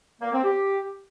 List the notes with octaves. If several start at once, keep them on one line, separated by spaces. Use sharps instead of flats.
A#3
C4
G4